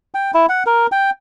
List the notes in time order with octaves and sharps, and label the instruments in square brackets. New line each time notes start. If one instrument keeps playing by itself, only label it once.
[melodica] G5
E4
F#5
A#4
G5